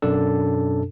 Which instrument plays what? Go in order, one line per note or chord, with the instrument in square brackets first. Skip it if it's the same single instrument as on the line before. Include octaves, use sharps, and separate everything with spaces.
[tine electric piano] F#2 B2 D4 A4